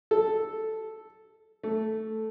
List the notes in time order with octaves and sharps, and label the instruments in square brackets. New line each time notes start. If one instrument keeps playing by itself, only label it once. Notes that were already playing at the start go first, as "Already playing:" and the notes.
[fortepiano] A4
A3